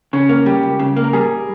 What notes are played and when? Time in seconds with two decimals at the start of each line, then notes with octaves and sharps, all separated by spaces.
0.13 C#3 C#4
0.29 A#3
0.46 G3 G4
0.63 C#2
0.79 C#3
0.96 A#3
1.04 A#4
1.13 G3 G#4